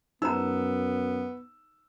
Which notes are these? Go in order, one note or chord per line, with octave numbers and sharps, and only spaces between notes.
F#2 B3 D#4 C5 A#5 E6